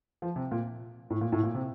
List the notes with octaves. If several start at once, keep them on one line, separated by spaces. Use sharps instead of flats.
F3
C3
A#2
A2
A#2
A2
A#2
C3